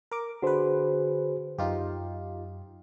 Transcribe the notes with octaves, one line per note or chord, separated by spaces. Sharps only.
A#4 D6
D3 F#4 G#4 B4 C5
F#2 D#4 F4 G4